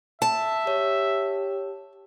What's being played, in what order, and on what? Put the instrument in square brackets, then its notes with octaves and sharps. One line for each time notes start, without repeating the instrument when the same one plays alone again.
[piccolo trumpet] E5 [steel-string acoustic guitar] A5
[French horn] G4 [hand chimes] C#5